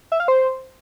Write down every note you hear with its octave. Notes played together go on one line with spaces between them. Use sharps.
E5
F5
C5